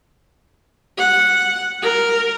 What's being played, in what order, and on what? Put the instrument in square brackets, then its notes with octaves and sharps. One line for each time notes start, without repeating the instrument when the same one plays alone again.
[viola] F#5
A#4